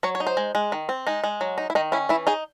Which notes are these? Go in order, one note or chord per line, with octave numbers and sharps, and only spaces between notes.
F#3 C#5
C#5
D#4
C5
G#3
G#3
D#3
C4
G#3 D#4
G#3
F#3
D#4
E4
D#3 D#4
C#4 E4
E3 E4
D#4 G#4